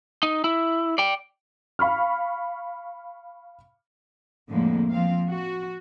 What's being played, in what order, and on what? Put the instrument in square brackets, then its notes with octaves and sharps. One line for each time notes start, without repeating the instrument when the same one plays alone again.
[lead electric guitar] D#4
E4
D5 G5
[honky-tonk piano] F5 B5 C#6 F6
[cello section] F2 A2 D3 G#3 A#3
F3 C4 F5
F#4